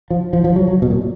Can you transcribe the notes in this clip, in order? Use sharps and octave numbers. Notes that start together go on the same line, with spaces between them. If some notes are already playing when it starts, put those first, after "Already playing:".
F3
F3
F3
F#3
F#3
B2
A#2